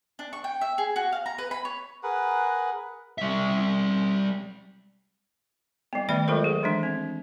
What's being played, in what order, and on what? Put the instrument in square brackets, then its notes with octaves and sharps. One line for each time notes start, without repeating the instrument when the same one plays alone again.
[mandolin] D4
C#6
G5
E5
G#4
F#4
F5
A#5
B4
B5
C#5
[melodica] G#4 A#4 B4 F#5
[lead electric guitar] G3 E5
[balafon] G3 B3
D#3 A3 D5 G5 B5
F#3 G#3 F4 A4 A#4 C5
G#4
E3 G#3 D4
C4